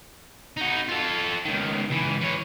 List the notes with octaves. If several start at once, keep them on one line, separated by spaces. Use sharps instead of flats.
D#4 F#4
F4 A4
C#2 D#3
C#2 E3
E3 C#5